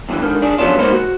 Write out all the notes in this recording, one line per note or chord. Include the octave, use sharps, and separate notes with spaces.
E2 G2 A#2 D3 E3
G#2 D3 D#3
D4 G#4
F3 F#3 B3 C#4 D4 F4
G#3 A#3 B3 D#4 C5
F#4